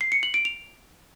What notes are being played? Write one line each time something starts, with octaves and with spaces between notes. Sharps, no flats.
C7
C#7
F#7
D7
F7